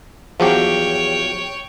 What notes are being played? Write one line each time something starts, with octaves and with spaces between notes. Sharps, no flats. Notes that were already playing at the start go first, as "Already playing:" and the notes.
E2 F3 F#3 G4 C#5 G5